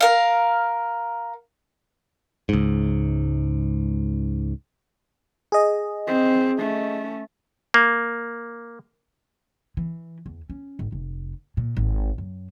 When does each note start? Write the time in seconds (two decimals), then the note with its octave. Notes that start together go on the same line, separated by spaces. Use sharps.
0.01 A#4 F5
2.49 C#2 G#2
5.52 G#4 D#5
6.08 C4
6.59 A3 C#4
7.74 A#3
9.77 E3
10.26 E2
10.50 C#4
10.79 G#1
10.92 F1
11.57 A#2
11.77 G#1
12.18 F#2